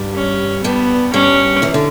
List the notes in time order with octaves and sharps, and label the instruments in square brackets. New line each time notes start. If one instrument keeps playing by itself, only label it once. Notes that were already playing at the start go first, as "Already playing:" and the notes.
Already playing: [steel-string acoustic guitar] G2 G3
[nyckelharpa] C#4
[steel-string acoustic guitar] G2 G3 [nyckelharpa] B3
[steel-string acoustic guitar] G2 G3 [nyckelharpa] C#4
[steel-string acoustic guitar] E2 E3
D3